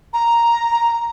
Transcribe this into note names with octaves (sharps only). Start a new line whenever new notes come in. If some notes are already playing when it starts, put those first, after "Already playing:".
A#5